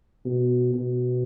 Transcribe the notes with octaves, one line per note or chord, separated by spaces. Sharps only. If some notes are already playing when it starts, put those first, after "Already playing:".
B2
B2